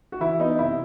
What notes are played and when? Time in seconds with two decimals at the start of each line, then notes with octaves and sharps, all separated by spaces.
0.12 F#4
0.20 E3 E4
0.39 B3 D#4
0.59 C3 E4